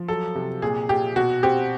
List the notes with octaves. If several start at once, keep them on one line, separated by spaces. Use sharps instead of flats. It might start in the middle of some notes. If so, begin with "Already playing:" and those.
Already playing: F3
F#3 A4
C3
A#2 G#4
A#2 G4
B2 F#4
C4 G4